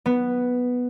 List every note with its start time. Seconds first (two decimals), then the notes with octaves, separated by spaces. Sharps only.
0.06 B3